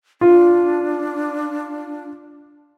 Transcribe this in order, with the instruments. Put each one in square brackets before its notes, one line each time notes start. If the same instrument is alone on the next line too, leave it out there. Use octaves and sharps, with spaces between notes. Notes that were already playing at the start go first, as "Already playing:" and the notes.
[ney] D4 [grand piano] F4